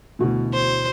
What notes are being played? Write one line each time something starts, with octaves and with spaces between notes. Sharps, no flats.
D2 B2 E3
C5